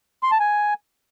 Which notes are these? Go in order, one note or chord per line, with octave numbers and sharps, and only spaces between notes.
C6
A5
G#5